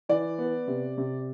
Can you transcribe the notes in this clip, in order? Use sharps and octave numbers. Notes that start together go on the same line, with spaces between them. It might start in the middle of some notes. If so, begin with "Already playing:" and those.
E3 D5
B3
C3
C3